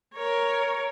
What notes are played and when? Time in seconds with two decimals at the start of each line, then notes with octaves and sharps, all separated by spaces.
0.14 A#4 C#5